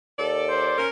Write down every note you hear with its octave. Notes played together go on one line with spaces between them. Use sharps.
D#2 A4 D5
C5
C#4 A#4